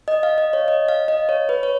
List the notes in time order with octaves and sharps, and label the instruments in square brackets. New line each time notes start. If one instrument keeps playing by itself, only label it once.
[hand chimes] D#5
F5
D#5
C#5
D#5
F5
D#5
C#5
B4
C#5